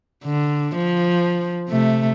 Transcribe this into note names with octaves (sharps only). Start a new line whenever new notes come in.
D3
F3
C3 A3